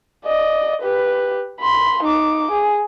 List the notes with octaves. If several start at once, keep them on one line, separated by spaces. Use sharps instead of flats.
D5 D#5
G4 B4
B5 C6
D#4 D6
G#4